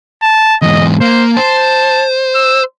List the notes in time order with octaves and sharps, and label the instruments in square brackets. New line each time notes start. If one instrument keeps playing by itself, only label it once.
[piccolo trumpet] A5
[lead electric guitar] E2 G#2 [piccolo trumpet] D#5
[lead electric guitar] A#3 [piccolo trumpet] C5
[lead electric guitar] C5 [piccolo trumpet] A5
[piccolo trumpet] E6